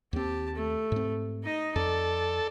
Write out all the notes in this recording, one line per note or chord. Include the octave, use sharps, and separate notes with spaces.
D#2 C4 G4 A5
A3
G#2 C4
D#4 D#5
F2 A4 D5